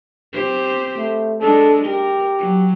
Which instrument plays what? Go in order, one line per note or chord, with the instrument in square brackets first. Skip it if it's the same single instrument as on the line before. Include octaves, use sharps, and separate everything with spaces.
[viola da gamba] C4 G4 C5
[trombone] A3
[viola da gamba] G#3 D4 [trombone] A4
[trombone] G4 [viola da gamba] A#4
[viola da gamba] F#3